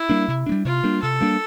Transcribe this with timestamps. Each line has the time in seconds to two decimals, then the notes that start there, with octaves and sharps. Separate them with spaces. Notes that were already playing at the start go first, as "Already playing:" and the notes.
Already playing: E4
0.10 G3 A#3 D4
0.28 C3
0.46 A#3 D4
0.52 G3
0.65 C3 F4
0.84 G3 A#3 D4
1.02 C3 A4
1.21 G3 A#3 D4